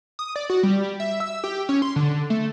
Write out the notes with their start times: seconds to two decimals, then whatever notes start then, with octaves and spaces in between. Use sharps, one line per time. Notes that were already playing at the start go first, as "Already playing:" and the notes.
0.19 D#6
0.36 D5
0.50 F#4
0.63 G3
1.00 E5
1.20 E6
1.44 G4
1.69 C#4
1.82 C6
1.96 D3
2.30 A3